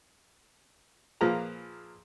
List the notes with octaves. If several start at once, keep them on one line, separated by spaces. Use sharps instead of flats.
A#2 F3 A#3 G#4 B4 A#5